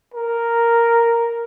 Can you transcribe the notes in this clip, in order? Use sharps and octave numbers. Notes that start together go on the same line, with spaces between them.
A#4